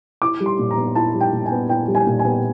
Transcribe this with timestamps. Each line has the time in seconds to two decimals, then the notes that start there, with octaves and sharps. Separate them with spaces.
0.22 E4 D6
0.40 G3
0.46 C6
0.59 A#2
0.71 A#5
0.77 B3
0.95 E4 A5
1.14 G3
1.21 G5
1.33 A#2
1.46 G#5
1.52 B3
1.69 E4 G5
1.88 G3
1.95 G#5
2.07 A#2
2.19 G#5
2.25 B3